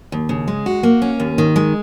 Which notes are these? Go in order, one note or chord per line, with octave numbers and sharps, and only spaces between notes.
D#2
C#3
G#3
F#4
A#3
C#4
D#2
D#3
G#3